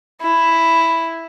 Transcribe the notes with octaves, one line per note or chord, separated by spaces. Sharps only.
E4